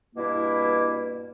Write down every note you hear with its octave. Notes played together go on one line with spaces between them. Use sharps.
G2 B2 A#3 E4